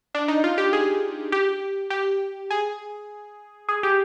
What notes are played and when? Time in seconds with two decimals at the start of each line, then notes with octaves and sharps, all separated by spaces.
0.15 D4
0.28 D#4
0.44 F4
0.58 G4
0.73 G#4
1.32 G4
1.90 G4
2.51 G#4
3.69 G#4
3.83 G4